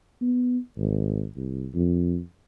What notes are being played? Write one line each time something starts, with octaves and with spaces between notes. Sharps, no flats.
B3
G#1
C2
F2